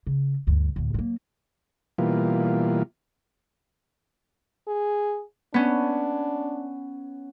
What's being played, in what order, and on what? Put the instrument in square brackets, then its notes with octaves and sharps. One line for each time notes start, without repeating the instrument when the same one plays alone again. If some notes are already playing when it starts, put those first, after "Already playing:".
[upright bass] C#3
D2 G2
D2 A2
F#3 A#3
[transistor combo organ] B2 E3 G3 A#3 F4
[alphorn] G#4
[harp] B3 C#4 [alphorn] D4